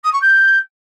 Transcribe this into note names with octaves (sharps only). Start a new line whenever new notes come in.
D#6
C#6
G6